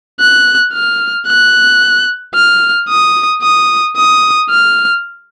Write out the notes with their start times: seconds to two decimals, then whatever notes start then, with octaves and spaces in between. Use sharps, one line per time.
0.20 F#6
0.73 F6
1.27 F#6
2.35 F6
2.89 D#6
3.42 D#6
3.96 D#6
4.50 F6